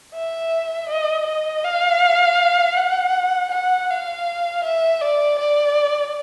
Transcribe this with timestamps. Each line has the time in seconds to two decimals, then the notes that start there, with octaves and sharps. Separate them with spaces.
0.14 E5
0.89 D#5
1.27 D#5
1.64 F5
2.77 F#5
3.52 F#5
3.90 F5
4.64 E5
5.02 D5
5.39 D5